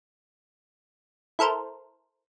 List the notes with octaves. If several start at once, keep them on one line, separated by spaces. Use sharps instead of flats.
E4 A4 A#4 C5